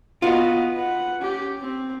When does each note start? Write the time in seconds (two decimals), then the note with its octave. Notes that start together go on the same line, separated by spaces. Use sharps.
0.22 B3 F4 F#4 D#5
0.75 B4 F#5
1.18 C#4 G4
1.61 C4